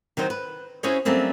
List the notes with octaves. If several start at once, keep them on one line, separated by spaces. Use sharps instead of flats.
D#3 F#3 D#4 C5
B4
C#4 E4 F#4 G#4 C5 C#5
F#3 G3 A3 A#3 C4 C#4